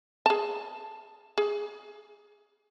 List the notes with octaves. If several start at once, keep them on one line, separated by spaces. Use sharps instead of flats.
G#4 A5
G#4